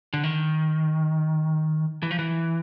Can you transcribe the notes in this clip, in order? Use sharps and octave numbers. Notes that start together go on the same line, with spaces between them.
D3
D#3
E3
F3
E3